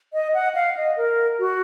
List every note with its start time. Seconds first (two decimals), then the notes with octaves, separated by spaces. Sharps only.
0.13 D#5
0.34 F#5
0.55 F5
0.77 D#5
0.97 A#4
1.39 F#4